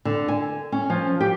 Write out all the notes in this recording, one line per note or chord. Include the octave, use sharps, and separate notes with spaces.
D3
G#5
C#4
F3
G4